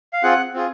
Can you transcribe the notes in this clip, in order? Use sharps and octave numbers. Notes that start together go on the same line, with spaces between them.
F5
C4 F4 G#4 F#5
C4 F4 G#4